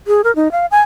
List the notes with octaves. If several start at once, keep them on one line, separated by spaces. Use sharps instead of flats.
G#4
A#4
D#4
F5
G#5